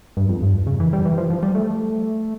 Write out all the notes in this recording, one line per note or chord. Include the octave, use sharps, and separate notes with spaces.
G2
F2
G2
F2
C#3
E3
G3
E3
F3
F3
G3
A3